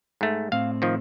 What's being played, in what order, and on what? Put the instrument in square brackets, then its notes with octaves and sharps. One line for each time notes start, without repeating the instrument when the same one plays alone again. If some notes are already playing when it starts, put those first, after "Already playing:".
[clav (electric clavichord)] G#2 A3
[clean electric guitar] A2 C4 [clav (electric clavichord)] F5
[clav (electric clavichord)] D#3 F3